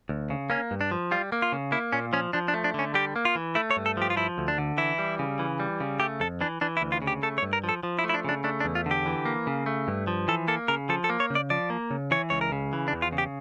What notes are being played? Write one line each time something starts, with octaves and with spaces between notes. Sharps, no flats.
D2
C#3
A#3 C#4
G2
D4
F3
G3 F4
A#3
F4
C#3
A#3 E4
A#2 C#4
F3 C#4
F3 D4
D4
A3
D4
D3 C#4
G3 G4
A#3
F4
E3
A3 E4
C#5
G2
A4
F3 G4
F4
F3 E4
D2
D4
D3
E3 E4
G3
C#3
E3
G3
C#3
A3 G4
F2 A4
E3 D4
E3 D4
E4
D2
F4
C#3
G4
A3 A4
C#5
G2
A#4
F3
A4
F3
E4
A3
E4
D4
C#3 D4
A3 D4
D4
E2
F4
D3 G4
E3
A#3
C#3
A3
G2
F3
E3 A4
A#3 A4
C#3 A#4
F3 A4
A4
A#3
C#5
C#3
D5
F3 D5
A#3
C#3
E3 C#5
C#2 C#5
A#4
C#3
E3
D4
E2
F4
C#3
G4